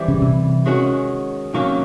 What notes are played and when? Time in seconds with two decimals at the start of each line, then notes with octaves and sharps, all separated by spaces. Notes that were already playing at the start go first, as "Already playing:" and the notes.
Already playing: E3 G3 C4 E4
0.08 C#3
0.22 C3
0.66 D#3 G#3 C#4 F#4
1.53 C3 D#3 F#3 A#3 C#4